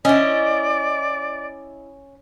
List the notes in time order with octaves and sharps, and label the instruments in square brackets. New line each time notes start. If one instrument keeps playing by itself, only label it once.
[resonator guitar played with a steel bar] C#4 [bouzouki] E4 D#5 [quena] D5